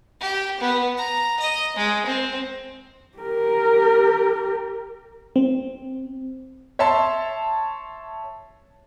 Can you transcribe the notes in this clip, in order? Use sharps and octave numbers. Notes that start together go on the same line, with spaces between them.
G4
B3
A#5
D#5
G#3
C4
G4 A#4
C4
C#5 E5 A5 C6